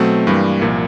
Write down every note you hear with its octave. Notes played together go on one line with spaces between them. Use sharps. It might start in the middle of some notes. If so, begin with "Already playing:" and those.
Already playing: B2 F#3 A3 C4
G2 E3 G3 A#3
C2 A#2 F3